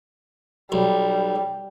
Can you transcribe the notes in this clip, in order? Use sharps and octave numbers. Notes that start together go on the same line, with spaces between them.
B1 G3